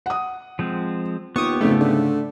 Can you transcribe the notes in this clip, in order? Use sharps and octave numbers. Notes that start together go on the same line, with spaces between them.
F#5 D#6
F3 G#3 C4
D#2 B3 F4 G4 C#6 D#6
F2 G#2 C#3 A3
D3